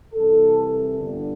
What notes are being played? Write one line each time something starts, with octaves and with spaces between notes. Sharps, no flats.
C2 C3 E3 A4
G1 G2 D3